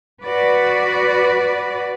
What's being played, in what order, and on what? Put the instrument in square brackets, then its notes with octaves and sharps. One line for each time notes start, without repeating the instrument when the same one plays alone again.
[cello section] F#4 B4 D5